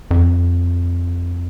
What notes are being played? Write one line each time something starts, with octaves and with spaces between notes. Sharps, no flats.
F2